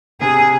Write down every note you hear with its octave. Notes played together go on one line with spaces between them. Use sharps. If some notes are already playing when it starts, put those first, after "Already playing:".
C3 G#4